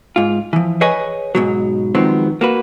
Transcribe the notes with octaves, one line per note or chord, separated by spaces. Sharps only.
G#2 F4
E3 F3
G#4 B4 C#5 D#5 G#5
G#2 B2 F#3
D#3 F3 F#3 G#3 B3 C4
A#3 F#4 B4